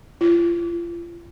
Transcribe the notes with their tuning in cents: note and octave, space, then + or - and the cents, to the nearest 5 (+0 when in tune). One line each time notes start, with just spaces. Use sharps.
F4 -35